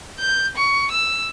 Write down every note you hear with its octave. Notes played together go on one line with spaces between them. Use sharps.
G6
C#6
E6